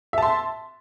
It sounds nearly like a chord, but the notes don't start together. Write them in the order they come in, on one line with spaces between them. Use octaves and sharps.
E5 A5 C6